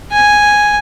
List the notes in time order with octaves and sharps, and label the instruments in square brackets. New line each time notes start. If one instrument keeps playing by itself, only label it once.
[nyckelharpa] G#5